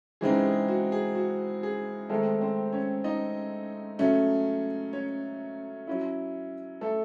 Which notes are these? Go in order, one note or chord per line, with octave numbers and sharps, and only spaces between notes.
C#3 E3 G#3 C4 D#4 G#4
G#4
F#4
G#4
F#4
G#4
D#3 G#3 A3 C4 D#4 A4
C4 C5
C#4 C#5
D#4 D#5
C#3 F#3 A3 C#4
C#4 C#5
F#3 C#4 E4
A3 A4